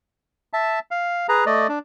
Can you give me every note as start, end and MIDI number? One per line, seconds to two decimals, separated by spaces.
0.53 0.79 76
0.53 0.79 81
0.91 1.27 77
1.29 1.45 68
1.29 1.45 71
1.29 1.45 82
1.46 1.67 57
1.46 1.67 74
1.46 1.67 75
1.69 1.79 62